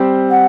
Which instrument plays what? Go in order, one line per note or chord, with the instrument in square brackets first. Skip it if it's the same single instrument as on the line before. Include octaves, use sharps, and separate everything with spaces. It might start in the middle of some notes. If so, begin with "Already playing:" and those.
Already playing: [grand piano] G3 C4 G4 C5
[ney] F#5